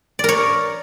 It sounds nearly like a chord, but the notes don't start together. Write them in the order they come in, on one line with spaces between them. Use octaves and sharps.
D5 A#4 C#5